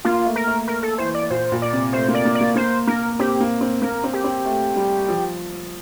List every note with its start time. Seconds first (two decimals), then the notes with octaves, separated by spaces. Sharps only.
0.05 A#3 F4
0.25 A3
0.36 A#4
0.47 A3
0.68 A#4
0.83 A4
0.98 E3 C5
1.15 D5
1.30 A#2 C5
1.52 A#2
1.62 D5
1.73 C3
1.93 A3 C5
2.08 A#3
2.15 D5
2.25 A#3
2.35 D5
2.41 A#3
2.56 A#3 C5
2.87 A#3 A#4
3.19 C4 G4
3.40 A#3
3.61 C4
3.82 A#3 A#4
4.04 C4
4.13 G4
4.24 C4
4.45 A3
4.76 G3
5.08 F3